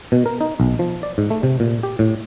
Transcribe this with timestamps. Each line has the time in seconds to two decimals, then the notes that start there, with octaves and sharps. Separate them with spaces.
0.12 B2
0.26 A#4
0.41 D#4
0.60 B1
0.79 F3
1.03 D5
1.18 G#2
1.30 A3
1.43 C3
1.60 A#2
1.83 G4
1.99 A2